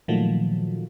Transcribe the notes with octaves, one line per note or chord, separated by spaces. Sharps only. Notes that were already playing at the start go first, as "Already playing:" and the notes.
A#2 D#3 F3 F#3 A3